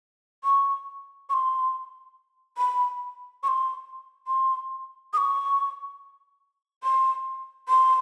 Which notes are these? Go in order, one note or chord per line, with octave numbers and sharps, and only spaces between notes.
C#6
C#6
C6
B5
C#6
C6
C6
D#6
C#6
C6
C6